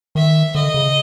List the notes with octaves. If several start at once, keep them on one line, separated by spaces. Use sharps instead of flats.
D#3 E5
D3 D#5
C#3